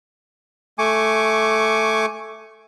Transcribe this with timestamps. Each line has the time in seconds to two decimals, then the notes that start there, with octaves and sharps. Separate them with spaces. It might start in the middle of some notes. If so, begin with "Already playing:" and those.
0.79 A3 G#5 C#6 D6